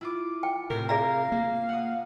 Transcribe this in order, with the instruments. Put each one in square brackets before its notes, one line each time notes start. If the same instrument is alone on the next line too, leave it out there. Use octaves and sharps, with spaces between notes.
[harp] E4 F4 D6
[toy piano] G5
[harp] A2 [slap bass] C3 [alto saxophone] A#4
[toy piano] G#4 D5 A#5 [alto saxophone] F5 [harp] A#6
[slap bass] A#3
[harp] F#5 D#6